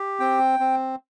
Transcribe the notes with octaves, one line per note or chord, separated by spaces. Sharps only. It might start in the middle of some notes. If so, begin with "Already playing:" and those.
Already playing: G4
C4 G5
C4